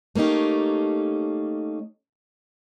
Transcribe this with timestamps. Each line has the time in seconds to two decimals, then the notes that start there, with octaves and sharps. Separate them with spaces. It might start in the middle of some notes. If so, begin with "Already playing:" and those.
0.16 A3 A#3 C#4 D#4 G4